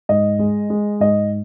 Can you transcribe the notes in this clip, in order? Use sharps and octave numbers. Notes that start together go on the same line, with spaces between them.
G#2 D#5
G#3
G#3
G#2 D#5